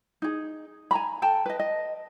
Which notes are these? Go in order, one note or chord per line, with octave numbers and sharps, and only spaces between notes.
D#4 G#4
G#5 A#5 B5
A4 G5 A5
B4 D#5
D#5